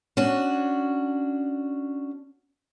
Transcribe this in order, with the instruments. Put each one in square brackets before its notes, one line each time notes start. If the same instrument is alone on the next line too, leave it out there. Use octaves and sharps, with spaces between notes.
[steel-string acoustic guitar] C#4 D4 F#4